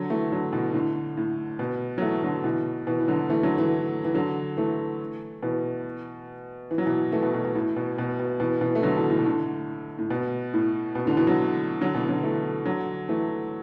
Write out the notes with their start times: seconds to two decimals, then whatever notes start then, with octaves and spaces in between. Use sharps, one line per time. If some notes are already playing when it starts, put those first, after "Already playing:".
Already playing: D3 F#3
0.10 E3 A3
0.32 D3 F#3
0.52 B2 E3
0.74 A2 D3
1.17 A2
1.59 B2
1.98 F#3
2.02 E3 A3
2.23 D3 F#3
2.44 B2 E3
2.87 B2 E3
2.99 E3
3.08 D3 F#3
3.30 E3 A3
3.43 D3 F#3
3.58 E3 A3
4.04 E3
4.14 D3 F#3
4.57 E3 A3
5.43 B2 E3
6.71 E3
6.78 F#3
6.86 B2 E3
7.12 E3 A3
7.23 B2
7.34 B2
7.45 B2
7.55 A2
7.76 B2
7.98 B2
8.19 B2
8.40 B2 E3
8.61 B2 E3
8.75 A3
8.83 D3 F#3
8.97 B2 E3
9.10 A2
9.19 B2
9.26 A2 D3
9.99 A2
10.10 B2
10.54 A2
10.95 B2
11.06 A2 D3
11.17 B2 E3
11.27 D3 F#3
11.81 D3 F#3
11.95 B2 E3
12.09 D3 F#3
12.23 E3 A3
12.65 D3 F#3
13.09 E3 A3